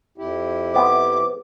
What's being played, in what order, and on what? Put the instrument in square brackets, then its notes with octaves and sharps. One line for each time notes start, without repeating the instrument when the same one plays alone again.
[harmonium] F2 E4 G4
[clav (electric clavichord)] C3 B3 [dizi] D6